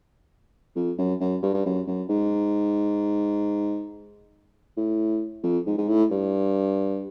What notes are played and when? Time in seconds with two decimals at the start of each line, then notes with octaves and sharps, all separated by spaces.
0.76 F2
0.98 F#2
1.20 F#2
1.43 G2
1.54 G2
1.66 F#2
1.87 F#2
2.09 G#2
4.77 A2
5.43 F2
5.66 G#2
5.78 G#2
5.88 A2
6.11 G2